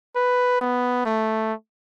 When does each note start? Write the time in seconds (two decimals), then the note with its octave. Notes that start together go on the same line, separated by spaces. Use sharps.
0.16 B4
0.61 B3
1.06 A3